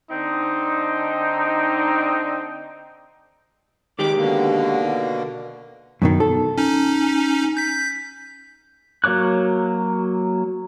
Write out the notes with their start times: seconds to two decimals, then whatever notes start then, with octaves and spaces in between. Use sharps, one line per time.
0.11 D3 C4 D#4
3.99 D#3 G#3 G4 D6
4.16 B2 D3 A#3
6.02 F#2 B2 D#3
6.20 A4
6.58 C#4 D#4
7.57 G6 B6
9.04 F#3 A#3 C#5 D6 F#6